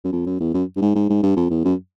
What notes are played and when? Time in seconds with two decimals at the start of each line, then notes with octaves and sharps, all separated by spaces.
0.04 F#2
0.13 F2
0.26 F#2
0.40 E2
0.54 F#2
0.76 G2
0.82 G#2
0.95 G#2
1.10 G#2
1.23 G2
1.37 F2
1.50 E2
1.65 F#2